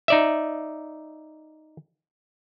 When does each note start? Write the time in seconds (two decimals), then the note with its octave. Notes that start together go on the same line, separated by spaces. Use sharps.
0.08 D#4 D5 E5